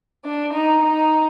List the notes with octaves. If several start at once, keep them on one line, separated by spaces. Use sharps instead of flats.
D4
D#4
D#4